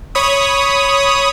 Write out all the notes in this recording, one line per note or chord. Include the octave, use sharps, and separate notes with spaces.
C#5 B5 D#6